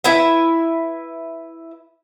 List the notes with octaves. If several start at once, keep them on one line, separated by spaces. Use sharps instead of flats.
E4 B4 E5